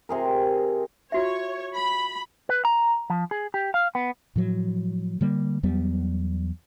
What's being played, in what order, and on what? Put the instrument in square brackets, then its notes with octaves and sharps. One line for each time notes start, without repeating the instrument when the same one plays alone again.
[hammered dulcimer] C3 G#4 A#4
[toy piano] F4 F#4 E5 [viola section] C#5
[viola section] B5
[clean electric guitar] B4
A#5
F3
G#4
G4
F5
B3
[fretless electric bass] A2 F3 F#3
D3 G3 A#3
E2 F#3 G3 B3